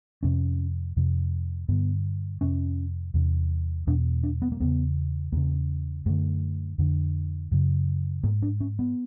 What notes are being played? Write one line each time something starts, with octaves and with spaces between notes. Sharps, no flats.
F2 C3 C#4
F2 C3
G2 D3 B3
F2 C3 C#4
E2 C3
E2 B2 D4
D4
B3
A#3
E2 C#3 B3
E2 C#3 A#3
F#2 D3 A3
F2 D3
F#2 C#3
G#2 A#3
D4
C#4
B3